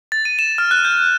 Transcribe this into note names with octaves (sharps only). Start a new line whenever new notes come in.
A6
D#7
E7
F6
F#6
G6